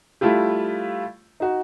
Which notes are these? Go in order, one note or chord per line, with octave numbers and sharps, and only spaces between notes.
G3 A3 E4 F4 G4
D#4 F#4